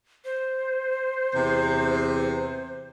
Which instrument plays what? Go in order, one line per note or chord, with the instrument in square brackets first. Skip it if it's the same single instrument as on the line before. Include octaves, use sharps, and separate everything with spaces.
[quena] C5
[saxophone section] E2 C3